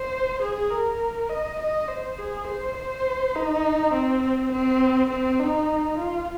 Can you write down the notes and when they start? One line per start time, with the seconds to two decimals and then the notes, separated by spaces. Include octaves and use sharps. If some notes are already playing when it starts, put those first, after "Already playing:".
Already playing: C5
0.42 G#4
0.71 A#4
1.29 D#5
1.60 D#5
1.88 C5
2.18 G#4
2.47 C5
2.77 C5
3.35 D#4
3.93 C4
4.52 C4
5.10 C4
5.39 D#4
5.98 F4